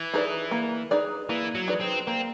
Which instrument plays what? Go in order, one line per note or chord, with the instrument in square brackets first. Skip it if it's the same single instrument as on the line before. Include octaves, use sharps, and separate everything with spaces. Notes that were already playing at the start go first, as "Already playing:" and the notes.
Already playing: [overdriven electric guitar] E3
[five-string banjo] D#4 G#4 B4 D5
A#3
D#4 G#4 B4 D5
[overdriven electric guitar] E3 [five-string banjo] A#3
[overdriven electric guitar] F#3
[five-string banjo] D#4 G#4 B4 D5
[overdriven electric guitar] C4
[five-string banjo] A#3 [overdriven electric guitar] C4